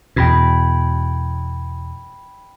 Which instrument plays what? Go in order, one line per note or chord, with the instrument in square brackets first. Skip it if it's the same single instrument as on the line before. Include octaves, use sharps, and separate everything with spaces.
[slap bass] E2 B2 [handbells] G5 B5 G#6